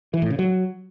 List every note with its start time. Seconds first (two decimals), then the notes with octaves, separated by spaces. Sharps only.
0.14 E3
0.22 A2
0.30 C#3
0.39 F#3